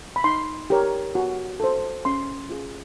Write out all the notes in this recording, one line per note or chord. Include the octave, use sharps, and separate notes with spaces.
B5
D#4 C6
G4 A#4 C#5
F#4
A4 C5
C#4 C6
F4 G#4